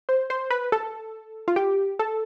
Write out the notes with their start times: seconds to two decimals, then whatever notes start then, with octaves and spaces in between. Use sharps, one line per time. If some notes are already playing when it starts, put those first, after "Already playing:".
0.09 C5
0.30 C5
0.50 B4
0.72 A4
1.48 F4
1.56 G4
1.99 A4